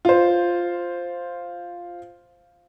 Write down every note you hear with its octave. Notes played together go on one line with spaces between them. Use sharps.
F4 C5